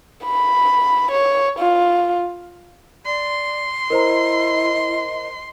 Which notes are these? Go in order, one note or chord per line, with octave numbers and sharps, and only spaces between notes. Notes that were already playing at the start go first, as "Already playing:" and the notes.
B5
C#5
F4
D5 C6
E4 A#4 C5 D#5 A#5